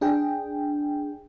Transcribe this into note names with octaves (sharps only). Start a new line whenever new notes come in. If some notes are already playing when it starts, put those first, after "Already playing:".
D4 G#4 G5